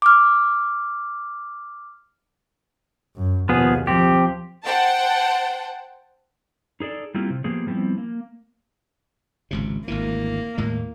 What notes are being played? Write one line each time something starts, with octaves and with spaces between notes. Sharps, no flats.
D6 F6
F#2
D#2 B2 F3 B3 G#4
F3 C4 G4
C5 F#5 G5 A5
D#4 G#4 A4 D5
G3 A#3 C4 E4 F4 G4
C3
F3 A#3 B3 G4 G#4
F3 G3 B3 C4 E4
A#3
G#1 C#2 C3
G#1 D2 E3 A#3
D#2 A2 G#3